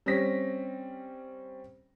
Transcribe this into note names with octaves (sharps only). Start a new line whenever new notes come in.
G3 C4 C#4 A#6 B6